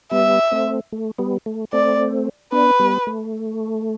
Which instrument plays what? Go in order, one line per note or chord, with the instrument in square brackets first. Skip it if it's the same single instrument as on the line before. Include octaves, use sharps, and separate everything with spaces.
[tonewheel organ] G3 B3 [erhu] E5
[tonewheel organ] A3 C4
A3
G3 B3
A3
[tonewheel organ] A3 C4 [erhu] D5
[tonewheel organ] B3 D4 [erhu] B4
[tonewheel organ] G3 B3
A3